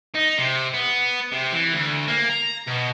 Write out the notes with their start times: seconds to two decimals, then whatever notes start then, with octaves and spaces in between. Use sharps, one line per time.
0.14 D#4
0.38 C3
0.74 B3
1.32 C3
1.53 E3
1.74 D2
2.08 A#3
2.30 A#5
2.67 B2